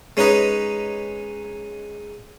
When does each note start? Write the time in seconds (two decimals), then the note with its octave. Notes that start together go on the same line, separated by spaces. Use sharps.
0.17 G#3 C#4 D#4 B4 D#5